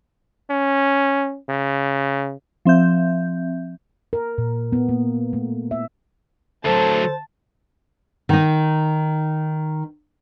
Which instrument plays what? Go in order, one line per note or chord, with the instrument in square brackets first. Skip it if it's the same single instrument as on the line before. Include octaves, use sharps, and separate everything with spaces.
[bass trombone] C#4
C#3
[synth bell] F3 C4 E5 G6
[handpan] A#4
A#2
B3
A#3
A3
E5
[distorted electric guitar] D2 F#3 [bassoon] A4 [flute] C5 [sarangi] A5
[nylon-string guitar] D#3 D#4